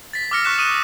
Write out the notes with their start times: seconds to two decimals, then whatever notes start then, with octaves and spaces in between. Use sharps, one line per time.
0.13 A6 B6
0.31 D6 E6 F6 A#6 C#7
0.44 C#6 F6 F#6 B6 E7
0.58 D#6 D#7 E7